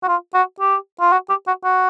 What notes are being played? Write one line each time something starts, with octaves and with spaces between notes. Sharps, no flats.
F#4
F4
F#4
G4
F4
F#4
G4
F#4
F#4